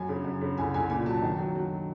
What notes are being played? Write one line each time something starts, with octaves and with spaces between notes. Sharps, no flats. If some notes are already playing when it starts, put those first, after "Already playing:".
Already playing: F#2 F#3 G#5
C#3
F#2
C#3
C2 G#5
C2 G#5
A#2 G#5
F#3 A5
D#3
F#3
F#3